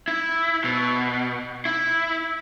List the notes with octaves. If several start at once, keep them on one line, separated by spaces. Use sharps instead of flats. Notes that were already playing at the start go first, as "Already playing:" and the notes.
E4
B2
E4